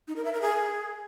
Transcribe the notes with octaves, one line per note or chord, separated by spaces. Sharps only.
D#4
A#4
E5
A#4
G#4